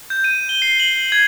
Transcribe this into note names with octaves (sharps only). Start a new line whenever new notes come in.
G6
D#7
G7
C7
F#7
G#6